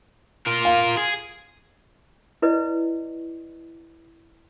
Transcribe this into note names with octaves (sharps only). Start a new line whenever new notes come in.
F4 A#4
F5
G#4
E4 B4 D5 D#5